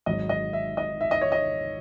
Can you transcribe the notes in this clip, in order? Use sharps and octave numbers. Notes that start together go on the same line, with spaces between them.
G#1 G#2 F#3 D#5
D#5
E5
D#5
E5
D#5
C#5
D#5